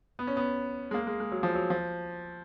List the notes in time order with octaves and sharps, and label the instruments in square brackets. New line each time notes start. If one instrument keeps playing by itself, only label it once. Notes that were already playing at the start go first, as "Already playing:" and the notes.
[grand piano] B3
C#4
B3
G#3
A#3
G#3
G#3
F#3
F3
F#3
F3